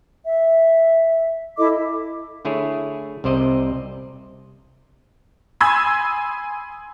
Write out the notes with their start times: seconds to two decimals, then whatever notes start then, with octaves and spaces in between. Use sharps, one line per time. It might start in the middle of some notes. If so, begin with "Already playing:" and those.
0.24 E5
1.57 E4 A4 D#5 D6
2.45 D3 A3 E4 G#4 C#5
3.24 C2 C3 C5 D5 D#5
5.61 G#5 B5 C6 D#6 E6 G#6